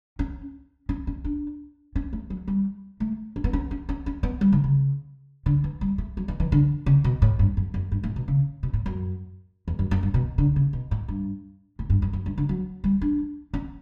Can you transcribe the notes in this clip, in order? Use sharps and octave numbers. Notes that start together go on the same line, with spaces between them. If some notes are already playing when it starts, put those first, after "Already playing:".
C#4
C#4
C#4
D4
C#4
A3
F#3
G3
A3
C#4
B3
C#4
C#4
C#4
C#4
B3
G3
D3
C#3
D3
E3
G3
A3
F#3
E3
E3
D3
C#3
B2
A2
G2
F#2
F#2
G2
A2
B2
C#3
B2
A2
F#2
E2
F#2
F#2
G2
B2
D3
C#3
B2
A2
G2
A2
G2
F#2
F#2
G2
D3
F#3
G3
D4
C#4